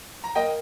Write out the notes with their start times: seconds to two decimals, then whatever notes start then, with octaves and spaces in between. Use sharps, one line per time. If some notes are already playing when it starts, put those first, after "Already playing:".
0.24 A#5
0.35 A#3 D#5 G5